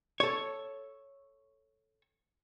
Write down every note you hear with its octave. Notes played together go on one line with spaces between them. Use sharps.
A4 C#5